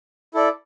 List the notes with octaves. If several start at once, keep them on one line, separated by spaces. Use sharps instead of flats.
E4 A4 D5